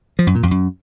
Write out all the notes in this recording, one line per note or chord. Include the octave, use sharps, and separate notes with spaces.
F3
F#2
A#2
F2
F#2